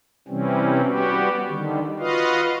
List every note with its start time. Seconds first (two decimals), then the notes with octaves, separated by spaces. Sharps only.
0.28 C3 E3 G3 C4 C#4
0.85 G3 B3 F#4 G4
1.48 D3 D#3 G3
1.99 F4 F#4 B4 D#5 F5